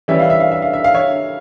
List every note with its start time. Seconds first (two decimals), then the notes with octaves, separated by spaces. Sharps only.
0.08 E3 G3 C#4 E5
0.19 F5
0.30 E5
0.40 F5
0.51 E5
0.62 F5
0.73 E5
0.84 F5
0.94 C#5 E5